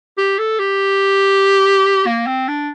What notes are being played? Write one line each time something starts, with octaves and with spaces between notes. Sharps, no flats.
G4
A4
G4
A#3
C4
D4